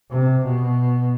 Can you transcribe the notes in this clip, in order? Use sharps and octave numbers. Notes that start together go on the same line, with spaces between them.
C3
B2